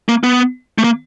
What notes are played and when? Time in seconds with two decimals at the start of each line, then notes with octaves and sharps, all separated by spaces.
0.09 A#3
0.23 B3
0.78 A3
0.84 A#3